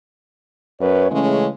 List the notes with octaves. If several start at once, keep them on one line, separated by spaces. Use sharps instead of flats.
F#2 B4 C#5
C#3 E3 G#3 A3 C#4